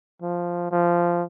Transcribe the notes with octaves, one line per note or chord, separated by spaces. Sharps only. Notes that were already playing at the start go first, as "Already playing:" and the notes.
F3
F3